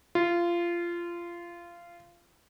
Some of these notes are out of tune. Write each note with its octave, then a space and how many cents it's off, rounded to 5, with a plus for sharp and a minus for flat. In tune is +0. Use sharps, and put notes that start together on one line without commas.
F4 -20